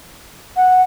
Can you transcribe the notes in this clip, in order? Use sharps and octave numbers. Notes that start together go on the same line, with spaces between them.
F#5